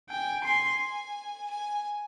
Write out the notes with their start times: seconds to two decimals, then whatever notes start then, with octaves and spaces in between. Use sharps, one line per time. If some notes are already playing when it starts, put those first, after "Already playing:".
0.09 G5 G#5
0.44 G#5 C6
1.49 G#5